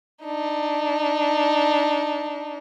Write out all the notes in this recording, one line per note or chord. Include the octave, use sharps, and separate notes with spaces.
D4 D#4